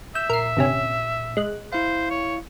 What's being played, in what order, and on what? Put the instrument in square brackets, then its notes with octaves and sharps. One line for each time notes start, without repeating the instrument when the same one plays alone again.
[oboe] E5 [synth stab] E6 [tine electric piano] G6
[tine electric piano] A#2 [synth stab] A#4 C7
[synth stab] G1 C3 C#4
G#3 F#6
[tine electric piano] E4 F5 [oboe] C5
[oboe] C#5